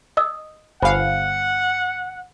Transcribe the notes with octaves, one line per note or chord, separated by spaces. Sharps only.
D#5 D#6 E6
G1 C5 F5 F#5 G#5 B5